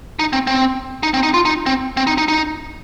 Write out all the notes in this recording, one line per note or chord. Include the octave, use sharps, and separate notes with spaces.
D#4
C4
C4
D#4
C4
D#4
F4
D#4
C4
C4
D#4
D#4
D#4